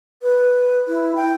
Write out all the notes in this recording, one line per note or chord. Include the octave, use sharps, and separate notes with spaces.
B4
E4
G5